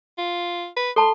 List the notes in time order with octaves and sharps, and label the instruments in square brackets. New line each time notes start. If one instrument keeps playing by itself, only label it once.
[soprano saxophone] F4
B4
[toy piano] A4 A5 B5 [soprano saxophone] C6